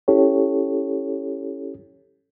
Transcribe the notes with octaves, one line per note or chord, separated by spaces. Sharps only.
C#4 E4 G4 A4 C#5